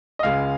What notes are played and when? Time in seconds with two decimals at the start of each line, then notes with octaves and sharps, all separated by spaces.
0.19 D#5
0.23 C#2 C#3 G#3 F5